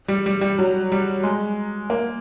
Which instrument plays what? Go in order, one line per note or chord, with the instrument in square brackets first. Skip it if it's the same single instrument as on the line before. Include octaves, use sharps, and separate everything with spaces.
[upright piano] G3
G3
G3
F#3
G3
G#3
A#3